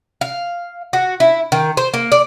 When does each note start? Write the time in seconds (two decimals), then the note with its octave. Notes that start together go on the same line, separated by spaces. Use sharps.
0.21 F5
0.93 F#4
1.20 E4
1.52 D#3
1.77 C5
1.94 A#3
2.12 D5